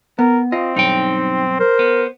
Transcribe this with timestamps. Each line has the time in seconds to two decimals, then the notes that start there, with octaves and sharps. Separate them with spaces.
0.19 B3 A#4
0.52 C4 F4 D#5
0.77 B1 G2 D#4 G5
1.60 A#4 C5
1.79 B3